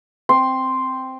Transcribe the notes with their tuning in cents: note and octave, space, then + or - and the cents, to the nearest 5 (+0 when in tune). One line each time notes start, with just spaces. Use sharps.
C4 +0 C6 +0